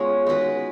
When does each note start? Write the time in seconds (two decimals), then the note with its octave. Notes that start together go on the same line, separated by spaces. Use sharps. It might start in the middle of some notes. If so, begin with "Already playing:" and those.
Already playing: G#3 B3 C#4 F4 G#4
0.26 G#3 D#4 F#4 B4